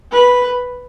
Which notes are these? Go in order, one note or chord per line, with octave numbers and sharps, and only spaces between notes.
B4